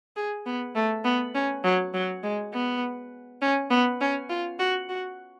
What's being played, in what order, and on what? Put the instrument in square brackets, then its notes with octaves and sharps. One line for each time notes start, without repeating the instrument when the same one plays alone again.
[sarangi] G#4
B3
A3
B3
C#4
F#3
F#3
G#3
B3
C#4
B3
C#4
F4
F#4
F#4